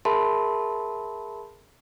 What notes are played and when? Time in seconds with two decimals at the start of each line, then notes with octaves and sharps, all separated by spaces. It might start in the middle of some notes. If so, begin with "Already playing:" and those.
0.05 G#4 A#4 E5 A5 B5 C6